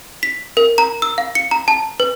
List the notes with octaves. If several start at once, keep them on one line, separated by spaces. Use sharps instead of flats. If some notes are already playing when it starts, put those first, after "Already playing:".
B6
A#4
A#5
E6
F5
C#7
A#5
A5
B4